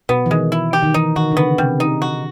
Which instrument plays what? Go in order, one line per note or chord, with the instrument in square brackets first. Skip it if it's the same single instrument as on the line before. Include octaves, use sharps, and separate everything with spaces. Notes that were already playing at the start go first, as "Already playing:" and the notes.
[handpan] B2 [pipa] B3
[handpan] E3
[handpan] D#3 [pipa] G#3
[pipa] E4
G4
[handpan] D#3
[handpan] E3 [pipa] D#4
[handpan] D#3 [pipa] F#4
[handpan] D3
[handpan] C#3 [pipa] B3
[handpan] C3 [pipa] G3
[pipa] D#4
F#4